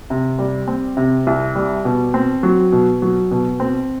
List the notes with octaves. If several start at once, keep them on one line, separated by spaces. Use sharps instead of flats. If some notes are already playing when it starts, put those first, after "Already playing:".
C3
G3
C4
C3
C2
G3
B2
C4
F#3
B2
F#3
B2
C4